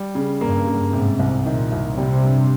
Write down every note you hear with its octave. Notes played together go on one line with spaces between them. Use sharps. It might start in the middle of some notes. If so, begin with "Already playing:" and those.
Already playing: G3
C#3
G2 A#3
C#3
G#2 C3
C2
A#2 D#3
C2
C3 G3
G2